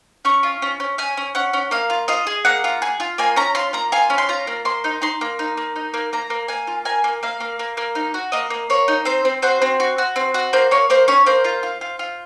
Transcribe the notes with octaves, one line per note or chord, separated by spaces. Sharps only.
C#4 C#6
F4
C#4
C#4
C#4 G#5
C#4
C#4 F#5
C#4
A#3 F5
F4
F4 D#5
G#4
A#3 F#5
F4
G#4
F4
A#3 G#5
C#4 A#5
F4 C6
A#3 A#5
F4 G#5
C#4
C6
F4 A#5
A#3
A#3 C6
D#4
D#4 C6
A#3
D#4
A#3
D#4
A#3
A#3 A#5
A#3
A#3 G#5
F4
A#3 G#5
A#3
A#3 F5
A#3
A#3
A#3
D#4
F#4
A#3 D#5
A#3
A#3 C#5
D#4
C4 C5
C4
F#4 C5
C4
F#4
F#4
C4
F#4
A#3 C5
A#3 C#5
A#3 C5
C#4 C#5
A#3 C5
F4
F4
F4
F4